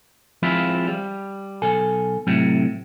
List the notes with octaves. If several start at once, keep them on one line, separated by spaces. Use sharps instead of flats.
F3 G#3 C4 E4 F4 F5
G3
B1 A4 G#5
A2 C3 F#3